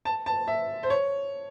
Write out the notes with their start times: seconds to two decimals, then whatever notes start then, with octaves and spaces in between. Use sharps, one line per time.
0.05 A5
0.26 A5
0.47 E5
0.83 C5
0.90 C#5